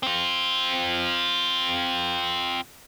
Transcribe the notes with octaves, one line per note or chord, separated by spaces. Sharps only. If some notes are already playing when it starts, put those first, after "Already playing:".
C4 F4